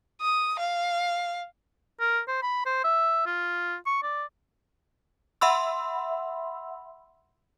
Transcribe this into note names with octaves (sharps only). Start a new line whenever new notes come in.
D#6
F5
A#4
C5
B5
C5
E5
F4
C#6
D5
E5 F#5 B5 C6 E6